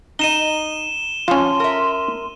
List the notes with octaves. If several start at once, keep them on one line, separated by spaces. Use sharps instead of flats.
D#4 D#5 D#7 E7 G7
F3 C#4 F4 C6
A#4 E5